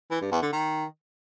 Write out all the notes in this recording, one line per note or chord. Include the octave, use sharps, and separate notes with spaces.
E3
G2
E2
D3
D#3